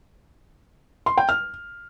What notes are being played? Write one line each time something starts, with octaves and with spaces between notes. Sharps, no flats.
C6
G5
F6